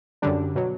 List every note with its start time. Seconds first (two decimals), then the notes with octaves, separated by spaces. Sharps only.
0.22 F#2 D3 G3 D4
0.55 B2 F#3